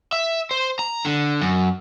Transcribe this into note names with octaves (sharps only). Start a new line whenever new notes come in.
E5
C5
A#5
D3
F#2